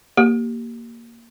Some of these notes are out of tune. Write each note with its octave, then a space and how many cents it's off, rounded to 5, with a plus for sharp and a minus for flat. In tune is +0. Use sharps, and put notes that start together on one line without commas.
A#3 +0 G4 -10